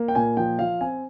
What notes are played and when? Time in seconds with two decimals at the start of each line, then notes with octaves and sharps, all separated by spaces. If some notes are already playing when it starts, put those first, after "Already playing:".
Already playing: A#3
0.08 G5
0.15 A#2 G#5
0.37 F3 G5
0.59 F3 F5
0.80 C4 G#5